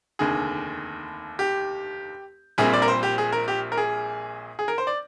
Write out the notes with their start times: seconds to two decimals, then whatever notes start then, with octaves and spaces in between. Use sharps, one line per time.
0.19 F1 D#2 D3 G#4
1.39 G4
2.58 A#1 A#2 G3 C4 G#4
2.73 D5
2.82 A#4
2.88 C5
3.03 G4
3.18 G#4
3.33 A#4
3.48 G4
3.72 A#4
3.77 G#4
4.59 G#4
4.68 A#4
4.78 C5
4.87 D5